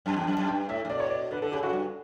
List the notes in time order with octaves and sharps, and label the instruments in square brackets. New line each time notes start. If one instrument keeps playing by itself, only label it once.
[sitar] F#2 [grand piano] A5
[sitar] E2 [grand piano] G5
[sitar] F#2
[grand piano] A5
[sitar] F#2
[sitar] G2 [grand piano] G5
[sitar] A2 [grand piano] E5
[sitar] A2
[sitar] B2 [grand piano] D5
[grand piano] C#5
D5
[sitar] D3 [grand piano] B4
[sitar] D3 [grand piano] A4
[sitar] C#3 [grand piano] G4
[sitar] C#3 [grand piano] F#4
[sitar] G2